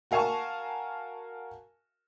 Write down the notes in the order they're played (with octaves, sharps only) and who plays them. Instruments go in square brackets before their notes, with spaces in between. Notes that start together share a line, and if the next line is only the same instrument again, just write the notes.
[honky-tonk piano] F#4 A#4 F5 G#5 A5 C#6